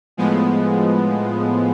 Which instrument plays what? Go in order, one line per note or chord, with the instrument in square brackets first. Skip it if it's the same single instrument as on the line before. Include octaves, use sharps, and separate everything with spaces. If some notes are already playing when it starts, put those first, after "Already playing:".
[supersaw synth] A2 F3 G#3 B3